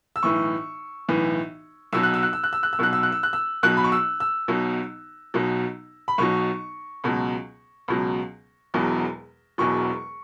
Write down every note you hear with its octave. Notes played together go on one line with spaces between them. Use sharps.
E6
B1 A2 E3 C#6
B1 A2 E3
B1 B2 F#3 E6
F#6
E6
F#6
E6
F#6
E6
F#6
E6
B1 B2 F#3 F#6
E6
F#6
E6
F#6
E6
B1 B2 F#3 F#6
B5
C#6
E6
E6
B1 B2 F#3
B1 B2 F#3
B5
B1 B2 F#3 C#6
C#2 B2 F#3
C#2 B2 F#3
E1 E2 B2 F#3
E1 E2 B2 F#3 C#6